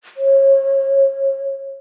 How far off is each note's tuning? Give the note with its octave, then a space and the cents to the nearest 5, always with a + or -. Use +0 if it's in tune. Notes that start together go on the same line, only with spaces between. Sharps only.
C#5 -30